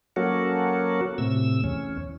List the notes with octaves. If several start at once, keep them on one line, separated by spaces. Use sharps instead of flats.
F#3 A#3 C#4 F#4 A4
A2 C3 E6
E2 C#4